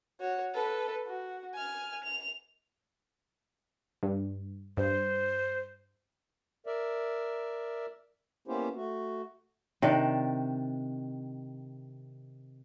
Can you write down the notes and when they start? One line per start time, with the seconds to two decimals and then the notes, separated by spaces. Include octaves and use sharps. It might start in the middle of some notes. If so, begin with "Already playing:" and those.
0.20 F#4 C#5
0.54 A4 B4
1.06 F#4
1.54 G#5 F6
2.04 F7
4.03 G2
4.77 G2 C5
6.66 A#4 D5 E5
8.48 A#3 B3 C#4 E4 G4 C5
8.75 A3 F#4
9.82 C3 D#3 D4 D5